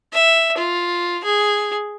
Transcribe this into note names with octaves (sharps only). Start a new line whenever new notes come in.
E5
F4
G#4